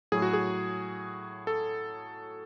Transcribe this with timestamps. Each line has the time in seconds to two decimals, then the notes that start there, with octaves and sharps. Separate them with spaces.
0.12 A2 F#3 G#4
0.22 F#4
0.33 G#4
1.47 A4